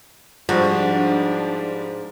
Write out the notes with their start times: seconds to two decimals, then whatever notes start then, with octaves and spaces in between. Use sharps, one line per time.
0.49 G#2 F3 G3 D4 F#4